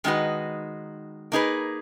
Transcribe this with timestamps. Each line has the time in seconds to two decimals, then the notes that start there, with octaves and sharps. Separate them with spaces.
0.04 D#3 G#3 D#4 F#4 B4
1.32 A#3 D#4 G#4 B4